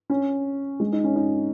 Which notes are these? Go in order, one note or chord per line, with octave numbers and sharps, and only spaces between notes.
C#4
G#3
D#4
C#4
D#4